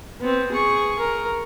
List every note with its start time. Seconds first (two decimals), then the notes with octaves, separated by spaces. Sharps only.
0.21 B3 C4
0.52 G#4 C#6
0.99 A#4